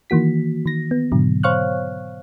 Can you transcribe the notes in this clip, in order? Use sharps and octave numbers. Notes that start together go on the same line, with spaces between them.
D#3 E3 A#3 F#4 B6
D#3 A#6
B3
G#2 B2 D3 F#3
C5 C#5 F5 C#6 F6 F#6